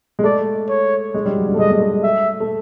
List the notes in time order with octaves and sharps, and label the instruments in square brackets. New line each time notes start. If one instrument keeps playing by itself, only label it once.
[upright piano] G#3
[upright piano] A3 [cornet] D5
[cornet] C#5
[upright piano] G#3
G3
F#3
G3
A3
[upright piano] G#3 [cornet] D#5
[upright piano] G#3
A3
[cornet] E5
[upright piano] A3